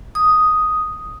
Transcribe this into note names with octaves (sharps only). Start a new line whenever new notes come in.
D#6